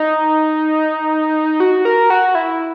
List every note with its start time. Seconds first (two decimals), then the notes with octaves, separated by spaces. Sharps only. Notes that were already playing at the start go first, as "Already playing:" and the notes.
Already playing: D#4
1.60 F#4
1.85 A#4
2.10 F#4
2.35 E4